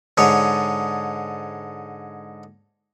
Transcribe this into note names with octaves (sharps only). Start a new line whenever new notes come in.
G#2 D3 G#4 C#5